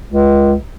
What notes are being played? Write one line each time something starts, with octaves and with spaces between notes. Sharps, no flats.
C#2